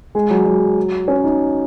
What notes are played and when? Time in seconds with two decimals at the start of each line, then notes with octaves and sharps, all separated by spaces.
0.15 G#3
0.30 F#3
0.46 F#3
1.08 C#4
1.24 D#4